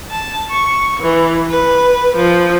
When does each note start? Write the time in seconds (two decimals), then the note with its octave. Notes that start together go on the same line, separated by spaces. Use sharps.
0.11 A5
0.51 C#6
1.00 E3
1.50 B4
2.16 F3